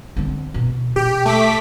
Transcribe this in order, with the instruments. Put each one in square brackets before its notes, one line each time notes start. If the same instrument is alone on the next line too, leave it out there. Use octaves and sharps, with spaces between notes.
[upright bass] D3 C4
B2
[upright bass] B2 [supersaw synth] G4
[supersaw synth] A3 D6 B6